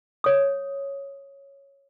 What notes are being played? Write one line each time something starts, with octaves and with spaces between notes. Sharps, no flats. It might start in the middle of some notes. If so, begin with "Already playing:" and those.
C#5 D#6